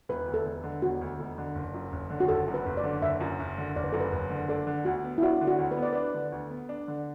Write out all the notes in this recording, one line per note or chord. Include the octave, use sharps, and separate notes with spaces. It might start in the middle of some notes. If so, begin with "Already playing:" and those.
E1 B4
D2
A4
E1
D3
E1 F#4
D2
E1
D3
F#1
F#2
F#1
D3
F#4
F#1 A4
F#2
B4
F#1
D5
D3
F#1 E5
F#2
F#1
D3
F#1 D5
B4
F#2 A4
B4
F#1
D3
D4 A4
D3
D2 F#4
B3
E4
D4 F#4
D3
F#4
D2
B4
B3
D5
D4 B4
D3
D2
B3
D4
D3